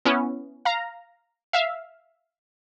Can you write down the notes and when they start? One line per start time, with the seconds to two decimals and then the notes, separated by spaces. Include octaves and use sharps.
0.05 B3 C#4 E4
0.65 F5 A#5
1.53 E5 F5